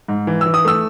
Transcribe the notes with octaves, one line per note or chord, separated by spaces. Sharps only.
G#2
E3
E3 E6
D#6
A3 E6